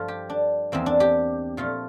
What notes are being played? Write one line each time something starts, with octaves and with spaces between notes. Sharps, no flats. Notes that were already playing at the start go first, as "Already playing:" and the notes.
Already playing: G2 F3 A3 F4
G4
D4
E2 E3 A#3 C4
D4
G4
A#2 F3 A3 F4